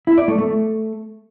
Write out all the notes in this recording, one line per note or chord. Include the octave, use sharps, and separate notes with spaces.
E4
D5
A3
A3